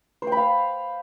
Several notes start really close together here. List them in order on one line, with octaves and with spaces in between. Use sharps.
C5 G5 B5 F5